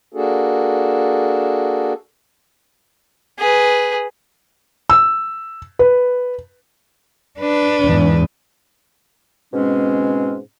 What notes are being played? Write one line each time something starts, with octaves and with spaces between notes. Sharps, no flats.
A#3 D4 F#4 G#4 A4
G#4 B4
E6
B4
D4 B4
E2 G#2
G#2 B2 G#3 C4 C#4